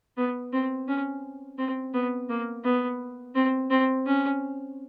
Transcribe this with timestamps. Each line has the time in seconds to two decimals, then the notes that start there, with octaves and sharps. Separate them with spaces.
0.17 B3
0.53 C4
0.88 C#4
1.58 C4
1.94 B3
2.29 A#3
2.64 B3
3.35 C4
3.71 C4
4.06 C#4